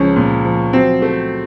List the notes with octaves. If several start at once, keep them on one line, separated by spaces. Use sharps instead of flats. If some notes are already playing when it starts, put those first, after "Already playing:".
Already playing: C#2 F3 C#4
A#2
F3
F#3 C4
A3